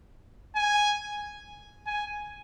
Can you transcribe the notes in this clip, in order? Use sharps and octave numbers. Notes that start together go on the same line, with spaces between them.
G#5
G#5